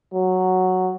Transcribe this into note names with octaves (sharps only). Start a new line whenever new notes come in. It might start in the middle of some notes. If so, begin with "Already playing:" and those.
F#3